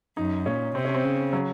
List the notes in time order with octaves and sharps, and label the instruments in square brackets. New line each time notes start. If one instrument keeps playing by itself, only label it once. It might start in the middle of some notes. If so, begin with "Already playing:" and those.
[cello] F#2 [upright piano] D#4
[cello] A#2 [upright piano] C#4
[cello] C3 [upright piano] C4
[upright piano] C#4
C4
[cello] C#3
[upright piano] F#3